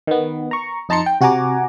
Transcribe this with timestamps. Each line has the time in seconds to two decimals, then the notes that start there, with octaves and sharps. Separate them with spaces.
0.07 D#3 B3
0.51 A#5 C#6
0.89 F2 D#4 A5 A#5 C6 C#7
1.06 G5
1.21 C3 F#4 F#5 G#5 A#5 D6